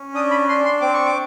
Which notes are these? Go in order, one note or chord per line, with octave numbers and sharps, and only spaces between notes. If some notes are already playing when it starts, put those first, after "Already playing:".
Already playing: C#4
D4 D#6
B5
D4 C6
C6
C4 D6
C#6
D6